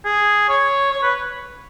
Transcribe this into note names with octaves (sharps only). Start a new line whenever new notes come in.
G#4
C#5
C#5
B4